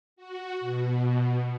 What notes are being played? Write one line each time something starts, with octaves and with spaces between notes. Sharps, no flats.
F#4
B2